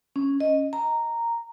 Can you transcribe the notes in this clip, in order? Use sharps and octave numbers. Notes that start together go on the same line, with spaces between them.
C#4
D#5
A#5